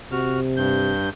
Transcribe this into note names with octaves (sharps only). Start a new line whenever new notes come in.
C3 F#4 F6
G2 G6